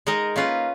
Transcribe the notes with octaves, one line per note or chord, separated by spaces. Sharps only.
G#3 D#4 A#4
A#3 C#4 F4 B4